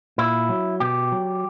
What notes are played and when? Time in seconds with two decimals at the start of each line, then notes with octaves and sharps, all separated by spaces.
0.18 A#2 E4
0.49 F#3
0.80 B2 G4
1.12 F#3